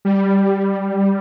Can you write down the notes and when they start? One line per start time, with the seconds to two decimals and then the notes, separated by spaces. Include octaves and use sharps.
0.05 G3